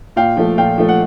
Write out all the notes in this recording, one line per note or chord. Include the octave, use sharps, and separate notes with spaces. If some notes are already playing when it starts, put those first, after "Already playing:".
A#2 F5 G5
F3 A3
A#2 F5 G5
F3 A3
F#5